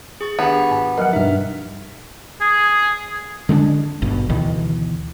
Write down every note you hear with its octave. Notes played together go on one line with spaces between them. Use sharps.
G#4 C#6 A6
D#3 B3 D4 G4
G#2
F3 F#3 A#4 D#5 F#5
G2 B2 D#4 E5 F6
G#4
D3 G#3 C#4 D4
G#1 G2 B2
D2 B2 D#3 E3